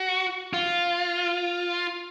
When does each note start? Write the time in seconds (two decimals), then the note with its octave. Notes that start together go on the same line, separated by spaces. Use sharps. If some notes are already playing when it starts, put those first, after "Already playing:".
Already playing: F#4
0.53 F4